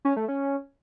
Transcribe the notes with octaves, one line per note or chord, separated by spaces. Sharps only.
C#4
A3
C#4